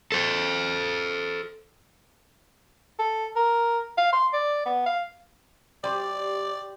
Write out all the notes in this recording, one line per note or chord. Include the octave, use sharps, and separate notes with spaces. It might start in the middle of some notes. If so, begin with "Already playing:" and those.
A4 C5
A4
A#4
F5
C6
D5
B3
F5
G3 G4 C5 D5